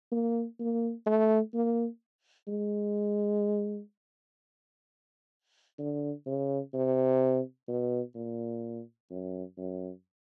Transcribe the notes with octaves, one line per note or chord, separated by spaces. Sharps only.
A#3
A#3
A3
A#3
G#3
D3
C#3
C3
B2
A#2
F#2
F#2